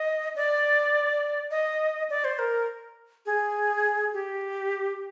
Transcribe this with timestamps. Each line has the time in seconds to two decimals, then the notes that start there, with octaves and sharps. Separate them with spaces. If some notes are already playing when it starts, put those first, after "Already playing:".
Already playing: D#5
0.36 D5
1.51 D#5
2.10 D5
2.24 C5
2.39 A#4
3.26 G#4
4.13 G4